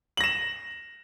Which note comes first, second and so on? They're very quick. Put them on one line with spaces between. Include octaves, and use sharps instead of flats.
F#7 A#6 E7